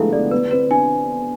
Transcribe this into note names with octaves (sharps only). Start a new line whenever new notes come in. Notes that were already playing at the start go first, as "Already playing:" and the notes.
Already playing: D3 F3 G#3 A3 B3 E4 G#4 F5
A3 D5
B3 B4
C4 B4
D4 G#5